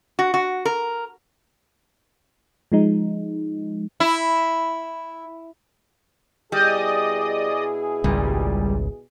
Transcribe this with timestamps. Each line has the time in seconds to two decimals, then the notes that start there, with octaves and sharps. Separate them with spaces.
0.19 F#4
0.34 F#4
0.65 A#4
2.72 F3 G#3 D#4
4.00 E4
6.52 B2 G3 E4 G#4 D5 D#5 D#6
8.04 G#1 C#2 A#2 G3